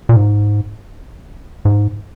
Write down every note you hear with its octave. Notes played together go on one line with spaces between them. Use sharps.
A#2
G#2
G#2